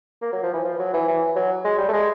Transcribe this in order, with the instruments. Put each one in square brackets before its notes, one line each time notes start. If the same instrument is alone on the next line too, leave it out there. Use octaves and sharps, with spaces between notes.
[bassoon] A#3
F#3
F3
E3
F3
F#3
E3
E3
F#3
G#3
G3
A3
G#3